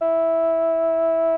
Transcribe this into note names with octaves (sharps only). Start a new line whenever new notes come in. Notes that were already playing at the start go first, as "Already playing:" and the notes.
E4